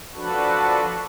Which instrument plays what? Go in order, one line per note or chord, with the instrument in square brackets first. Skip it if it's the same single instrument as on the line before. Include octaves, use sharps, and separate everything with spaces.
[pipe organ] F3 D4 F#4 A4 B4